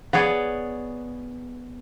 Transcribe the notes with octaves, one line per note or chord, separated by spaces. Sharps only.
B3 G#4 C#5 D5